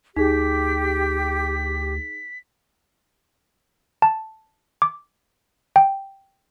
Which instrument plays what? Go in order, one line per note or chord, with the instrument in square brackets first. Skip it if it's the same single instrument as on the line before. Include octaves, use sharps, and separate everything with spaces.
[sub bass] D2 [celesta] D#4 G#4 [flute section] G4 [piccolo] B6
[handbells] A5
D6
G5